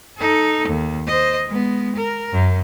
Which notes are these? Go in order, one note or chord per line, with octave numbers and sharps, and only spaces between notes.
D#4 A4
D#2
C5 D#5
G#3 B3
A#4
F#2